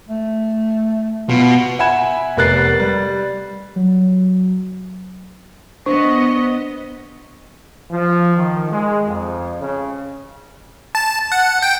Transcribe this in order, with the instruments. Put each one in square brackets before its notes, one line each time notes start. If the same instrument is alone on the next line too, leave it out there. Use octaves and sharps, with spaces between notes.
[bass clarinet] A3
[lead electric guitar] B2 [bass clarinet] F4
[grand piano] E5 F#5 G#5 B5 G#6 E7
F1 B3 A#4 F#6 A6 C7
G3
[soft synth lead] F#3
[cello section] B3 D#5 [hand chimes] D4 C5 C#6
[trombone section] F3
D#3
G#3
F2
C#3
[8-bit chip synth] A5
F#5
G5